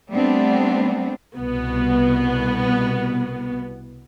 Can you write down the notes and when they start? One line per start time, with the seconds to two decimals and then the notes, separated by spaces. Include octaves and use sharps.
0.11 G3 A3 B3 C4 D4
1.35 C2 B2 B3